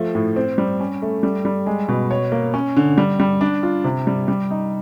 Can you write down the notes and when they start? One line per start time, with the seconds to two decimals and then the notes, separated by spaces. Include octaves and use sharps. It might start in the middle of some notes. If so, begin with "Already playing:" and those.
Already playing: F3 A3
0.15 A2
0.36 C4
0.58 G3
0.80 C#4
1.02 A3
1.23 G3
1.45 G3
1.66 G#3
1.89 B2
2.11 C#5
2.32 A#3
2.54 C#4
2.77 D3
2.98 G3
3.20 G3
3.41 D4
3.63 F4
3.84 C3
4.07 G3
4.28 G3
4.51 D#4